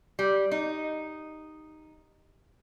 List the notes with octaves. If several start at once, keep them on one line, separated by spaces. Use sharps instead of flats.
G3
D#4